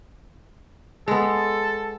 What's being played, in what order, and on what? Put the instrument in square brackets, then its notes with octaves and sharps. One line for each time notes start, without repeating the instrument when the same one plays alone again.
[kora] G#3 B3 [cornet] A4